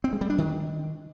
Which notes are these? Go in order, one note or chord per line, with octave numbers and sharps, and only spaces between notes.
C4
G#3
G3
D4
D#3